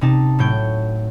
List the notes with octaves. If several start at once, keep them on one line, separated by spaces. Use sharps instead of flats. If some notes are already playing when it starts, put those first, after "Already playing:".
C3 D#4 A5
A2 F#3 C#5 G6 D7